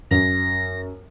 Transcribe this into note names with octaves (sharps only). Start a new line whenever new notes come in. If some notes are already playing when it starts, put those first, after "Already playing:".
F#2 A#6